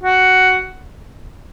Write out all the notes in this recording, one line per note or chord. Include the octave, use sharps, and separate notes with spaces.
F#4